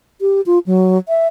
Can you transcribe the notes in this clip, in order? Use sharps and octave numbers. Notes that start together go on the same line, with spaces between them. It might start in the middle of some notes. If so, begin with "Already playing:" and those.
G4
F4
F#3
E5